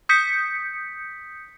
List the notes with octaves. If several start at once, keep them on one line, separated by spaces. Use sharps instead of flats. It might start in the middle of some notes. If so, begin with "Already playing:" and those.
D#6 G6 B6 C#7